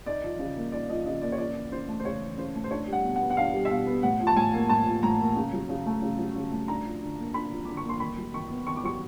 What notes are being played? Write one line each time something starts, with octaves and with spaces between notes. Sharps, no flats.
D#4 D5
F3
C#3
A#3
D#4 D5
F3 D#5
C#3 D#5
A#3 D5
C#5
C#3 D5
E3
C#3 C5
A3
C5
C#3 C#5
E3
C#3 C5
A3
C5
D4 C#5
G3
F#5
B2
F#5
B3
F#5
D4 F5
G3
E5
B2 F5
B3
A2 F#5
F3
A5
A2 G#5
A#3
A2 A5
F3
A2 A#5
A#3
C#3
F#3
C#3
A3
C#3
F#3
C#3
A3
D4 A#5
F3
D3
A#3
D4 B5
F3
D3 D6
C#6
A#3
C6
D#3 B5
F#3
D#3 C#6
B3
D#3 C#6
D6
F#3 C#6